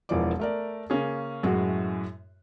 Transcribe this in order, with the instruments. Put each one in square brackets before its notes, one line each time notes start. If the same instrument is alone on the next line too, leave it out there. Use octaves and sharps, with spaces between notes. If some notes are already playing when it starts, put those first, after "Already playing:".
[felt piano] E1 E3 F3 A#4 D5 D6
A3 A#4 D5
C#3 A#3 C#4 G#4
F#2 A2 G#3 E4 F#4